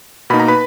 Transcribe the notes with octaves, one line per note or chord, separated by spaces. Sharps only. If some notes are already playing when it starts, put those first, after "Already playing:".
B2 A#3 D#4 B5
A#5
B4 B5